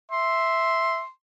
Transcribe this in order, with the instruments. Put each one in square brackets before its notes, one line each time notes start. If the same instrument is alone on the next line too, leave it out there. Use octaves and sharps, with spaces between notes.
[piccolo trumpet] E5 [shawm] C6